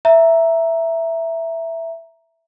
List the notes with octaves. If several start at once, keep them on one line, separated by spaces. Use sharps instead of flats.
E5 A#5